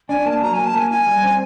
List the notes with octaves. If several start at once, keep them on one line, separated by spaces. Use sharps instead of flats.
D4 G#5
A#3 A5
F#3 A#5
A#3 G#5
A5
A#3 G#5
E4 G#5
G3
C4